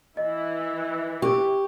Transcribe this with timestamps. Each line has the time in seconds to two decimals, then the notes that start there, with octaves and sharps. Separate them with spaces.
0.17 E3 E4 D#5
1.22 G4 C#6